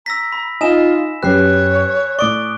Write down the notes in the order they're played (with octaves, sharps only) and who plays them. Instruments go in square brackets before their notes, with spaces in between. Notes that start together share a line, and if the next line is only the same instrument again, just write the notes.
[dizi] A#5 [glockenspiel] E6 A#6 B6
[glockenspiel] B5
[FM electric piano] D#4 D#5 [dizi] F4 [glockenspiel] G#5 E7
[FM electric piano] F#2 G4 B4 [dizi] C#5 [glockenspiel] F#6 C7
[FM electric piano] A2 D5 [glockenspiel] C#6 D7 [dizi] D#6